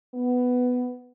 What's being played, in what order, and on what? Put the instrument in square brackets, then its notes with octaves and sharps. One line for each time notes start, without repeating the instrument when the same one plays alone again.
[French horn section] B3